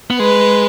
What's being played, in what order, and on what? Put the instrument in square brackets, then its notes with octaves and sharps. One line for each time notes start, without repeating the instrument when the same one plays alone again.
[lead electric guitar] B3
[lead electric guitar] G#3 [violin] B4